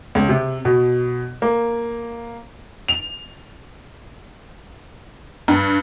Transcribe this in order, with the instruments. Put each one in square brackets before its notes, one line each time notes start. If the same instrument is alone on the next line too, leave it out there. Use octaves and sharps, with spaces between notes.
[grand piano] C#2
C3
B2
A#3
[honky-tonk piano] F7
G2